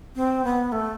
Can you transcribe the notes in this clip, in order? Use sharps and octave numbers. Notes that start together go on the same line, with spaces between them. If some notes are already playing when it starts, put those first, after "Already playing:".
C4
B3
A3